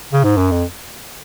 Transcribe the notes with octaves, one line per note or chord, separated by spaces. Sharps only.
C#3
G#2
F#2
F2